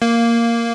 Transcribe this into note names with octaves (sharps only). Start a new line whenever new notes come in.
A#3